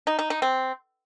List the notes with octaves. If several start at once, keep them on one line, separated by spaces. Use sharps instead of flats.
D#4
D#4
D#4
C4